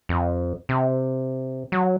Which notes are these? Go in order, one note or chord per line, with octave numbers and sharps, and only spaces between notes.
F2
C3
F#3